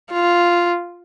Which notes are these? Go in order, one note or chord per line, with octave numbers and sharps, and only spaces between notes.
F4